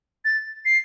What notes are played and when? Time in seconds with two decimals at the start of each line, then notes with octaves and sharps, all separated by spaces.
0.25 A6
0.65 C7